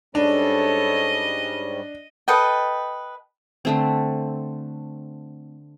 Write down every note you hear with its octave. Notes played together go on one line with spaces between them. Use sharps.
G#2 G3 C#4 D4 A4 C#5 D#5
A4 B4 D#5 G5
D3 A3 C4